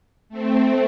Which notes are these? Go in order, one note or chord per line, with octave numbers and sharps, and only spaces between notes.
A3 C4